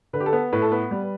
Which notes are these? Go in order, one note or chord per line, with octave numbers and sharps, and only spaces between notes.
D3 B4
G4
A4
B3
A2 B4
A4
B3 B4
G3